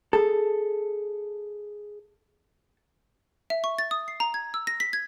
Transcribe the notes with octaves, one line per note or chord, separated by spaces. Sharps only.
G#4 A4
E5
C#6
A6
D#6
C7
A#5
G#6
E6
A#6
B6
G#6